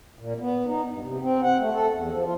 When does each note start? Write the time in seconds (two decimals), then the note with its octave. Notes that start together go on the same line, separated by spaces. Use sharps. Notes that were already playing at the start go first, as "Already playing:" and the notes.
0.19 A#2
0.40 B3
0.66 D#4
0.89 G2
1.01 C3
1.21 C4
1.42 F#5
1.59 A3
1.72 A4
1.91 E2
2.11 F3
2.24 F4